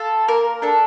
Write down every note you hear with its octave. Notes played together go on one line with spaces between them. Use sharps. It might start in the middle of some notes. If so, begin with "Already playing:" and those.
Already playing: F4 A4
A#3 A#4
D4 A4